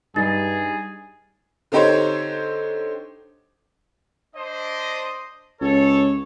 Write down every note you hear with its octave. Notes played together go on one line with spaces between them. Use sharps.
G2 G3 D#4 G#4 A6
D3 C4 D#4 G4 C5 C#5
D4 C5 D#5
C#2 A4 C#5